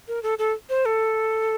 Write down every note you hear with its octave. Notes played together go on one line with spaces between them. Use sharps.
A#4
A4
A4
C5
A4